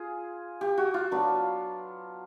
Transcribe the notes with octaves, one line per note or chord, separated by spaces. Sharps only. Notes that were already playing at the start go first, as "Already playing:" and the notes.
Already playing: F4 G#4
G4
F#4
F4
F#3 B3 D4